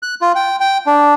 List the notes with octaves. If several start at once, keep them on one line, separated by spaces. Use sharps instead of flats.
F#6
F4
G5
G5
D4